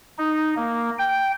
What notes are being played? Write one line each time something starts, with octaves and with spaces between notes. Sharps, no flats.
D#4
A#3
G5